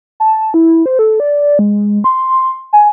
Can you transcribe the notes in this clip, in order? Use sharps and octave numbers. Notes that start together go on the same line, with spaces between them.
A5
E4
C5
A4
D5
G#3
C6
G#5